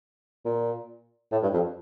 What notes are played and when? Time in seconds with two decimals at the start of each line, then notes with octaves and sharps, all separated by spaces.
0.45 A#2
1.32 A2
1.43 G2
1.53 F2